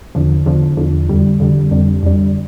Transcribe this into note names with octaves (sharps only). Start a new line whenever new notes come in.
E2 D3 F3
E2 D3 F3
E2 D3 F3
F2 D3 G3
F2 D3 G3
F2 D3 G3
F2 D3 G3